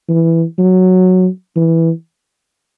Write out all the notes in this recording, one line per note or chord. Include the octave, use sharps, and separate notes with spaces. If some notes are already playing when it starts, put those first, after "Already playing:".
E3
F#3
E3